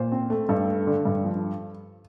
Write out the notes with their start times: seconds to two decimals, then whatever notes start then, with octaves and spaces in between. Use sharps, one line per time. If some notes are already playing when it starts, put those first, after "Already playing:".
Already playing: A#2 C5
0.12 C4
0.30 A3
0.49 G2 A4
0.68 A3
0.87 D3
1.05 G2
1.24 F3